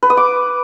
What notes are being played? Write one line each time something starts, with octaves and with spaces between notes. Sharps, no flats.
B4
D#6
D6